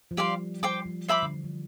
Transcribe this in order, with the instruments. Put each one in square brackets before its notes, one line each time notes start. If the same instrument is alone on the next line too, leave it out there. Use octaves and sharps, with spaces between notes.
[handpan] F3
[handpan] G3 [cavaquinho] G4 D5 F5 C6
[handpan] G3 [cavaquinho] C5 G5 D6
[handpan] F3
[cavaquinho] C5 E5 B5 D6
[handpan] D3
E3
F3